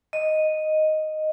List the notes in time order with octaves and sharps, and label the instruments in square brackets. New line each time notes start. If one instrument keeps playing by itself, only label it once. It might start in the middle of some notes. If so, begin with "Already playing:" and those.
[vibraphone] D#5